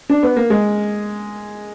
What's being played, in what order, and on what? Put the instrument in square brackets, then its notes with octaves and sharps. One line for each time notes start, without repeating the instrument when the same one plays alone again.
[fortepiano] D4
B3
A#3
G#3